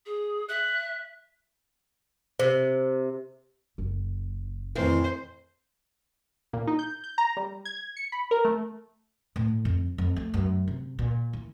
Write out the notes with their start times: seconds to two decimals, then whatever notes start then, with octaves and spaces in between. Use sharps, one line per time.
0.06 G#4
0.49 E5 F#6
2.39 C3 C5
3.78 F#1
4.75 F2 A2 D#3 E3 C5
6.53 A#2
6.67 D#4
6.79 G6
7.04 G6
7.18 A#5
7.37 G3
7.65 G#6
7.97 C#7
8.12 B5
8.31 A#4
8.45 A3
9.36 A2
9.65 F2
9.98 F2
10.16 A3
10.34 F#2
10.68 C3
10.99 A#2
11.33 E3